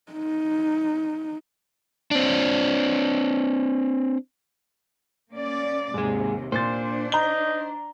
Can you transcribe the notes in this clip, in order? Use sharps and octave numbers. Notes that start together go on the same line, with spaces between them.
D#4
C4 D4
A#3 C#4 D5
D#2 G#2 C3 G#3
A#2 D4 C5 A6
D#4 A#5 G7